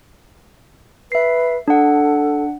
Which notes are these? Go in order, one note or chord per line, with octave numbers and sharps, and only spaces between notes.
B4 E5 C7
D4 A4 F#5